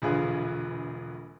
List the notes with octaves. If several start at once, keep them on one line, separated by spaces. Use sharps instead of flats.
E1 A#1 D3 F4 G#4 B4